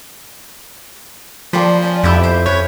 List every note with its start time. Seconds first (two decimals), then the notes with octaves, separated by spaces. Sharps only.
1.53 F3 A#3 D4 F4 G5 B5
1.82 C#4 D5 G5
2.03 F2 B3 E4 G4 E5 G5
2.23 C5
2.46 C#4 B4 C#5